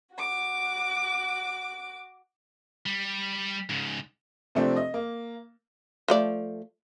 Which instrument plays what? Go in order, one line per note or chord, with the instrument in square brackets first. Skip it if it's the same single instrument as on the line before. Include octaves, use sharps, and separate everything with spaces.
[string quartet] F#4 D6
[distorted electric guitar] G3
G#2 C#3
[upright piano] C3 F3 A3 C4 D4
D#5
A#3
[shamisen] F3 A3 D5